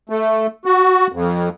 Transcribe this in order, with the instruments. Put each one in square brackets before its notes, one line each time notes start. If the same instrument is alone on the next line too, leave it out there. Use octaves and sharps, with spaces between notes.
[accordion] A3
F#4
F2